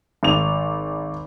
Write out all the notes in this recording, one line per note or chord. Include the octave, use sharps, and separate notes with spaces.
G#1 F7